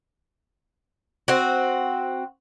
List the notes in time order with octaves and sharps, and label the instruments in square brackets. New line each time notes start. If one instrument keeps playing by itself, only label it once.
[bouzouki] C4 F#4